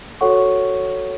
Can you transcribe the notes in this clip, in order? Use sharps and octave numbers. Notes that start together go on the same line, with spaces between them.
F#4 A4 C#5 F#5 C#6